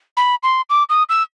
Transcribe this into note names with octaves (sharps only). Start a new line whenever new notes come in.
B5
C6
D6
D#6
E6